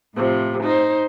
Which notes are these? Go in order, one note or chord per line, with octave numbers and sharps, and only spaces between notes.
A2 C3 F3
D#4 C5